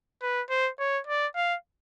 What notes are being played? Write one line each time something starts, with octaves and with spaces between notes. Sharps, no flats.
B4
C5
C#5
D5
F5